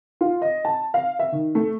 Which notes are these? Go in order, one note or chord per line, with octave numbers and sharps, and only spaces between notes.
F4
D#5
A5
F5
E5
D#3
A3